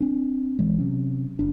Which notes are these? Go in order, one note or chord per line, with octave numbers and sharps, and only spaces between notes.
C4 D4
A#1 E3 G#3
C3 F#3 C#4
F#1 D4